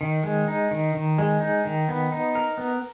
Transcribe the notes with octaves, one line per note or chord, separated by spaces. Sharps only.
D#3
G#3
D#4
D#3
D#3
G#3
D#4
D#3
B3
D#4
A#4
B3